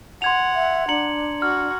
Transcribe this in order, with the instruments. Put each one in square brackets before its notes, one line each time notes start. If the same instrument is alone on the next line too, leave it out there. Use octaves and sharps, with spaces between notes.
[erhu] F#5 [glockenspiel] C6 G#6 F7
[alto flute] E5
[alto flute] D4 [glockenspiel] A#5 C#7 F#7
[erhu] F#4 [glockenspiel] F6